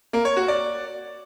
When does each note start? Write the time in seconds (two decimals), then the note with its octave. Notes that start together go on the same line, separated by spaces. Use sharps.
0.13 A#3
0.25 C#5
0.37 F#4
0.48 D5